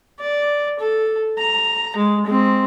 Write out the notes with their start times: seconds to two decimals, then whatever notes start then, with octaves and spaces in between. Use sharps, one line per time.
0.20 D5
0.80 A4
1.38 A#5
1.96 G#3
2.26 G#3 C4